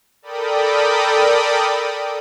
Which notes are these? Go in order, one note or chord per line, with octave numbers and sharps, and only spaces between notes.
A4 A#4 D5 G5 B5 D#6